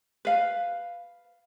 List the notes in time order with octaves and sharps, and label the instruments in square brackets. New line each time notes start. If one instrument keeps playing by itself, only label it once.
[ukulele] B4 F5